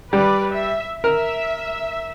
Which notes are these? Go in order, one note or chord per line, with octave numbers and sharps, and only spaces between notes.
G3 B4 D5
E5
A#4 E5